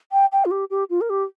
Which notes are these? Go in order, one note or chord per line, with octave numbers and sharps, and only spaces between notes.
G5
G5
F4
G4
G4
F4
A#4
G4